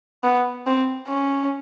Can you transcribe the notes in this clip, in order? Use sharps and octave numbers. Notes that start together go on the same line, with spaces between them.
B3
C4
C#4